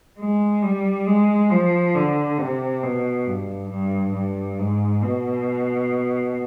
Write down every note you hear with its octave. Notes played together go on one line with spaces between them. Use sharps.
G#3
G3
G#3
F3
D3
C3
B2
G2
G2
G2
G#2
B2